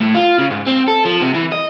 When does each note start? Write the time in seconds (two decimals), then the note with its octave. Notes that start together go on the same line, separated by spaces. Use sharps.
0.01 A2
0.15 F4
0.39 C#3
0.51 G#2
0.67 C4
0.88 A4
1.05 F3
1.22 C3
1.34 E3
1.52 D#5